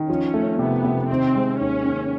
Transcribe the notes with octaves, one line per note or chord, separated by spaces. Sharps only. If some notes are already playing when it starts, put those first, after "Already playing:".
Already playing: D#3
F3 C#4
A3
C3 B3
C3
D#3 C4
G#3
D#2 C#4
D#2